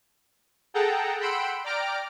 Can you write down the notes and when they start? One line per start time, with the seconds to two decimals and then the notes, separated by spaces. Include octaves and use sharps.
0.74 G#4 A4 F#5 G5 A5 A#5
1.19 F#5 G5 B5 C6 E6 D7
1.64 D5 G5 A#5 D6 F6 D7